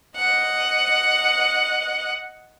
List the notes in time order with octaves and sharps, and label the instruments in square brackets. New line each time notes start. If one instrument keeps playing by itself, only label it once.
[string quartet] D#5 F#5